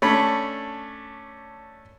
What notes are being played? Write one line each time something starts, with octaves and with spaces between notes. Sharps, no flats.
A3 C#4 D4 C#5 B5